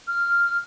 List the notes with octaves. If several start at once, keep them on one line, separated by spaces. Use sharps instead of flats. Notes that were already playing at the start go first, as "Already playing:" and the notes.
F6